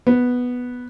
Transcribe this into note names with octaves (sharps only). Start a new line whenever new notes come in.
B3